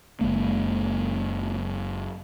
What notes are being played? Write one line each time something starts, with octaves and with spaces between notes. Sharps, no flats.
F#1 F2 G#3 A#3